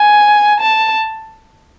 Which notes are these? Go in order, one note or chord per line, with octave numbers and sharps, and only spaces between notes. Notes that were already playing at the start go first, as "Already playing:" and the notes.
Already playing: G#5
A5